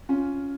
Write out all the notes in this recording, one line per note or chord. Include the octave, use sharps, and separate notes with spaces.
C#4 F4